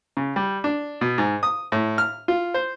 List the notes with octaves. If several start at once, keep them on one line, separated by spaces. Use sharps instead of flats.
C#3
G3
D4
B2
G#2
D#6
A2
F6
F4
C5